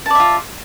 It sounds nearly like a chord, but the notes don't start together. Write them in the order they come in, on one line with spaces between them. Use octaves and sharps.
A5 D5 E5 F4